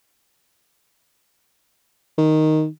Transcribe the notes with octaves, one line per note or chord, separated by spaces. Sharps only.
D#3